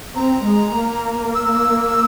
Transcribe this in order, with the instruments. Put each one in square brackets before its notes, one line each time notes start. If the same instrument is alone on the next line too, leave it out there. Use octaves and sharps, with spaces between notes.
[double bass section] C4 [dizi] A#5
[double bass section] G#3
A#3
[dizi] E6